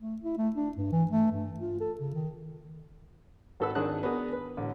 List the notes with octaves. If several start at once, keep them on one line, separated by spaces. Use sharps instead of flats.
A3
E4
A3
D4
G2
E3
A3
G2
F4
A4
C#3
D#3
G#1 F#4 A4 B4 E6
G#1 D#3 D4 G#4 A5 F#6
B3 D4 F#4 G#4 A#4
B4
A1 D3